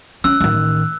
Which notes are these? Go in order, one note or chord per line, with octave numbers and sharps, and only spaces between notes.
C#4 E6 F#6
A1 D#3